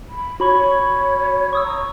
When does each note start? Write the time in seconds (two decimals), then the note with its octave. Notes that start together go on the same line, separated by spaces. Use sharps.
0.09 B5
0.40 F#4 C#5 B5 C#6
1.53 C#6 D#6 E6
1.64 A#5